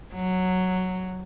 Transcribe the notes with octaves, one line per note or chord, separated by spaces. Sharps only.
F#3